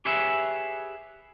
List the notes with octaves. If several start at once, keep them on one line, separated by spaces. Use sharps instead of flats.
G4 G#4 B4 C#5 E5